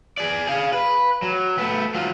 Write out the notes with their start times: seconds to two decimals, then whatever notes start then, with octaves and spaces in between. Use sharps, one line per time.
0.18 G#4 D5
0.47 G#4 F5
0.73 B4
1.22 F#3
1.58 A3 B3
1.94 F#3 F4